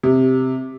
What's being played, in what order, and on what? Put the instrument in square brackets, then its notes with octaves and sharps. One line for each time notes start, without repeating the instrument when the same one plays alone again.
[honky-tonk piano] C3